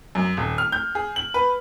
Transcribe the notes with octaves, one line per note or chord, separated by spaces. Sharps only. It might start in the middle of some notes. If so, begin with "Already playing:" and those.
F#2
D#1
F6
G6
G#4
F#7
B4